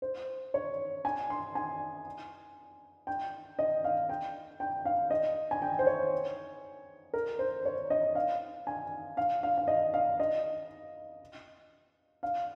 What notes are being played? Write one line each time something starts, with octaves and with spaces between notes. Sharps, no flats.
C5
C#5
G#5
C6
G#5
G5
D#5
F5
G5
G5
F5
D#5
G#5
G5
C5
C#5
A#4
C5
C#5
D#5
F5
G#5
F5
F5
F5
D#5
F5
D#5
F5